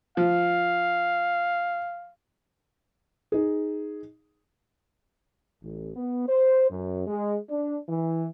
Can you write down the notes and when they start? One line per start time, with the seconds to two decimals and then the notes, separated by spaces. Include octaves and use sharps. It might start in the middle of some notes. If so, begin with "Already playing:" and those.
0.17 F3 F5
3.32 D#4 G#4
5.63 A1
5.95 B3
6.26 C5
6.70 F#2
7.07 G#3
7.49 D4
7.88 E3